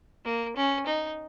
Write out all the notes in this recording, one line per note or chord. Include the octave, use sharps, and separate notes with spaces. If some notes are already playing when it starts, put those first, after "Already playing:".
A#3
C#4
D#4